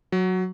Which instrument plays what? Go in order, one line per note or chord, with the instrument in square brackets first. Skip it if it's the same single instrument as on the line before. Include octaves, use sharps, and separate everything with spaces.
[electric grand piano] F#3